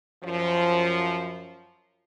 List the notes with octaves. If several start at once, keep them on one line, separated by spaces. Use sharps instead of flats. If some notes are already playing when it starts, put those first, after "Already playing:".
F#2 F3